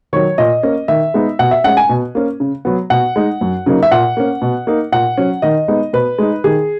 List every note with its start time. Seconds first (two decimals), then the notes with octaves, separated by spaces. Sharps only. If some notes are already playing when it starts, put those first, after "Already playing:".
0.13 D#3 F#3 C#5
0.38 A#2 D#5
0.63 A#3 C#4
0.88 D#3 E5
1.14 G#3 B3 D#4
1.39 B2 F#5
1.51 E5
1.64 G#3 C#4 F#5
1.77 G#5
1.89 B2
2.15 A#3 C#4
2.40 C#3
2.65 F#3 B3
2.90 B2 F#5
3.16 G#3 D#4
3.41 F#2
3.66 C#3 F#3 A#3 D#4
3.83 E5
3.91 A#2 F#5
4.17 A#3 C#4
4.42 B2
4.67 A#3 D#4
4.92 A#2 F#5
5.18 F#3 C#4
5.42 D#3 D#5
5.68 G#3 B3 D#4
5.93 B2 B4
6.18 G#3 D#4
6.44 D#3 G#4